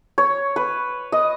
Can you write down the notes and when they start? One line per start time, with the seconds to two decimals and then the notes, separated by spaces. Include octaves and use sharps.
0.18 C#5
0.56 B4
1.12 D#5